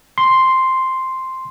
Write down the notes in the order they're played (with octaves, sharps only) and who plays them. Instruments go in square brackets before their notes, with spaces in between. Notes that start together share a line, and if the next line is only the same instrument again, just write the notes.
[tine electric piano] C6